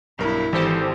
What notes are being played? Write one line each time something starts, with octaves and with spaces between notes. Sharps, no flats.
B1 G2 E4 A#4
G#1 E3 G4 A4 C5